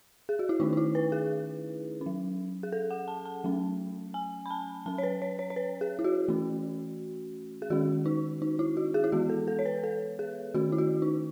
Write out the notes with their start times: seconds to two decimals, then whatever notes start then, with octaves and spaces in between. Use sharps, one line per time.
0.29 G#4
0.39 F#4
0.49 E4
0.60 D#3 A3 C#4 D#4
0.73 D#4
0.77 E4
0.95 B4
1.12 G#4
2.01 C#4
2.06 F#3
2.63 G#4
2.72 A4
2.91 F#5
3.08 A5
3.25 A5
3.44 F#3 A3 C#4
4.14 G#5
4.46 B5
4.50 A5
4.86 F#3 C#4 A5
4.98 C#5
5.03 B4
5.22 C#5
5.39 C#5
5.50 C#5
5.56 B4
5.81 G#4
5.99 E4
6.04 F#4
6.28 E3 A3 C#4
7.62 G#4
7.70 D#3 G#3 C#4 F#4
8.06 D#4
8.42 D#4
8.59 E4
8.77 F#4
8.94 G#4
9.04 E4
9.12 E3 G#3 B3 F#4
9.29 A4
9.48 A4
9.59 C#5
9.66 B4
9.84 A4
10.19 G#4
10.54 D#3 A3 C#4 F#4
10.72 E4
10.78 F#4
11.02 D#4